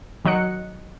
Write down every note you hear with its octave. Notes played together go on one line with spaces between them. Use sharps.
D#3 F#3 D#5 F#6 C#7